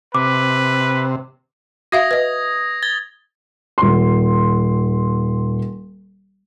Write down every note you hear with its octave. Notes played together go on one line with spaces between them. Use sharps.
C3 B4 D6
F#4 E5 F5 D#6 G#6 A#6
B4 D#5
G#6 A6 G7
D#1 C6